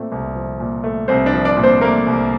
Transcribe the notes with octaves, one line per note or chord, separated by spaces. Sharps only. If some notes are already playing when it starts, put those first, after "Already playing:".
Already playing: A#2 A3 C4
C2
F3
A#2
A3
C2 C4 C5
D4 D5
F3
D4 D5
A#2
C4 C5
A3 A#3 A#4
C2